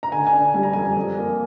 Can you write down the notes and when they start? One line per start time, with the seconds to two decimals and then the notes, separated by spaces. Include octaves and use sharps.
0.03 A#5
0.12 D3 G#5
0.27 G#5
0.33 D4
0.54 G3 G#5
0.63 A#5
0.73 F2 G#5
0.97 F2
1.17 A#3